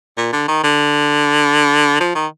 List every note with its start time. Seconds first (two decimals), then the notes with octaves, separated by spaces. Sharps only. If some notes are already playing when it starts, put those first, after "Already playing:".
0.17 A#2
0.32 D3
0.48 D#3
0.63 D3
2.00 F3
2.15 D#3